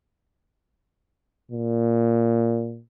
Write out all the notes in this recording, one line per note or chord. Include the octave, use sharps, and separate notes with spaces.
A#2